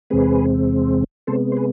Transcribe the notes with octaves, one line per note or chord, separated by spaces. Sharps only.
E2 C3 G#3 C4 G#4 B4
C3 G#3 B3 A4 C5
C5
G#4 B4